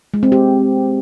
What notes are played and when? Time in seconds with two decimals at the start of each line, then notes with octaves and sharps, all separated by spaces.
0.14 G#3
0.23 C4
0.32 G4